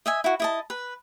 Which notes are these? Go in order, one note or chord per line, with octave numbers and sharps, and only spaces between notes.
D#5 E5 G#5
E4 F#4
E4 D#5 A5
B4